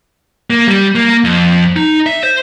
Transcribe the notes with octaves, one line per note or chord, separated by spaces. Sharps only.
A#3
G3
A#3
F2
D#4
E5
C5